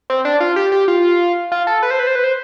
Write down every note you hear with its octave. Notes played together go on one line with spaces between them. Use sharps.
C4
D4
F4
G4
G4
F4
F4
A4
B4
C5
B4
C5
B4
C5